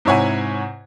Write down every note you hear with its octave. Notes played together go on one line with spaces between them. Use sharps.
G#2 C3 E4 C#5 F#5 G#5